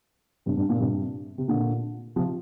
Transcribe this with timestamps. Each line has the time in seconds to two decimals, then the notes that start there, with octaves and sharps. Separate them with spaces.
0.46 G2 C3
0.57 G2
0.69 A#2
0.80 G2 C3
1.38 C3
1.48 A#2 D3
2.16 C3 F3